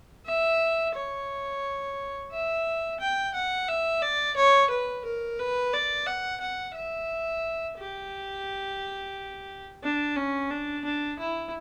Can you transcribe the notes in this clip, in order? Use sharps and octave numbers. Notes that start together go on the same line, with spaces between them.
E5
C#5
E5
G5
F#5
E5
D5
C#5
B4
A#4
B4
D5
F#5
F#5
E5
G4
D4
C#4
D4
D4
E4